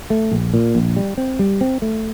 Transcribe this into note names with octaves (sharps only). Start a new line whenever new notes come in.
A3
A#1
A#2
A#1
G3
C4
G3
C4
A3